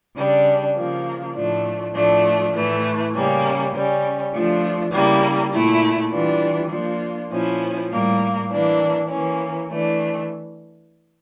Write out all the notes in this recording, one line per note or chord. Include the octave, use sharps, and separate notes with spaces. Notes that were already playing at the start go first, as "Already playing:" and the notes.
C#3 G3 D4
C#3 F3 A#3
A2 F3 A3 D4
A2 F3 A3 D4
A2 E3 A3
C#3 G3 A#3 C#4
C#3 G3 C#4
F3 A3 D4 F4
C#3 G3 A#3 E4
A#2 A3 E4
E3 G3 D4 F4
F3 A#3 D4 F4
A#2 F3 C#4 E4
A2 G3 A#3
E3 A#3 D4
E3 A#3 C#4
E3 A3 D4